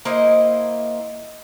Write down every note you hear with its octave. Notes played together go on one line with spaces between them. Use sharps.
A#3 E4 C5 D#5